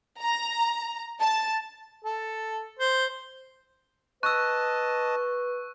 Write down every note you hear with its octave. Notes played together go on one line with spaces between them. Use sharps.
A#5
A5
A4
C5
B4 D#5 A5 C#6 E6 F#6